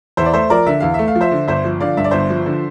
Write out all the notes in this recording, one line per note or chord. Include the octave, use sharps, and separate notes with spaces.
E2 C5 E5
D5
A3 C5 E5
F3 A#4 D5
D3 E5
E2 F5
A3 E5
F5
F3
C5 E5
D3
G1 C5 E5
F3
D3 D5 F5
G2 E5
D5
G1 C5 E5
F3
D3